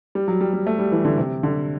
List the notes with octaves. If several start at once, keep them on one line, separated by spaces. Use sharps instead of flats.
G3
F#3
G3
G3
A3
G3
E3
D3
C3
D3